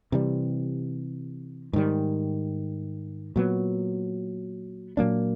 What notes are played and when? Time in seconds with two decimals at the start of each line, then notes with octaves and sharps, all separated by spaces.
0.12 C3 E3 G3
1.73 G#2 D#3 G3
3.36 A#2 F#3 B3
4.97 A#2 F#3 A#3 D4